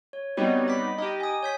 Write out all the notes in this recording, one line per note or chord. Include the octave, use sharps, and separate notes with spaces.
C#5
G3 B3 C4 D#4 F#4 C#5
B5 D6 B6
D#4 G4 D#5
G#5 D#6
C#5 G6 B6